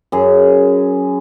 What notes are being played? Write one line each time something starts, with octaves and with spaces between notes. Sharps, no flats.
F#2 G#4